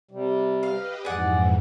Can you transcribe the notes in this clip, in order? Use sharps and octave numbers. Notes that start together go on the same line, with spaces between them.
C3 G3
G4 B4 D#5 F5
F2 G#2 E3 G#4 D5 F#5